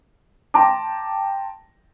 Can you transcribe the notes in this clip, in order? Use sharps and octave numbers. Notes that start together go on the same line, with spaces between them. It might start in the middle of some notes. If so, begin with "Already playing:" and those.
G5 A5 A#5 C6 D6